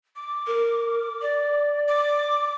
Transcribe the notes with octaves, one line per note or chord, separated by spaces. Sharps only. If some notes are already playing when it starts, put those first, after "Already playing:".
D6
A#4
D5
D6